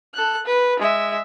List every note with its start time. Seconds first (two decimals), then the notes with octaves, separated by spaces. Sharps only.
0.14 A4 F#6
0.46 B4
0.79 G#3 E5